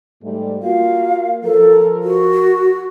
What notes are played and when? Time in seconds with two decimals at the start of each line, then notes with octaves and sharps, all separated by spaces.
0.23 G#2 G3 A3
0.62 A#3 F4 F#4 F5
1.44 F3 A4 A#4
2.03 F#4